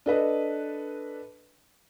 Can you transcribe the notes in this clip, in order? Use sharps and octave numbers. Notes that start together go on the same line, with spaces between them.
D4 A4 B4 D#5